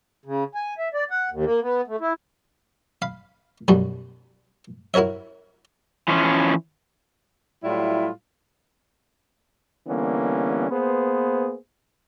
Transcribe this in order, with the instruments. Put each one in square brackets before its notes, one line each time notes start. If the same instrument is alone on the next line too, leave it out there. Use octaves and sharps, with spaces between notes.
[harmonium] C#3
G#5
E5
D5
F#5
D#2
A#3
B3
A3
E4
[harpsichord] F5 B5
B1 F#2 G3 F#4
E4 F#4 A#4 C#5 E5
[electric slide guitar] E3 F3 C#4
[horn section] A2 F#3 G3 E4 F4
[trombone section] D3 E3 G3 A#3 B3 C#4
A#3 B3 G#4 B4 C5